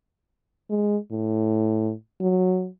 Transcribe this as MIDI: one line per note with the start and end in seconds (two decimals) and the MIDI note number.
0.70 0.97 56
1.12 1.92 45
2.21 2.68 54